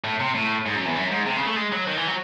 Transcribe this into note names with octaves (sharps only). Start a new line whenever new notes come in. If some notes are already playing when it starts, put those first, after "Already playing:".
A2
C3
A2
G#2
F#2
E2
F#2
G#2
C3
C#3
A3
G#3
F#3
D#3
E3
F#3